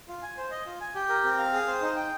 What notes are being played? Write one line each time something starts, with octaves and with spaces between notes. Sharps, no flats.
F4
G#5
C5
D#5
F4
G#5
G4
A#4
C4
F5
G#4
C5
D#4
G5